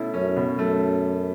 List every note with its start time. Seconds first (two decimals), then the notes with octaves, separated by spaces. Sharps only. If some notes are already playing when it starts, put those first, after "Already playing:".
Already playing: B2 A3 C#4 E4
0.14 F#2 C#4
0.37 B2
0.58 F#2 A3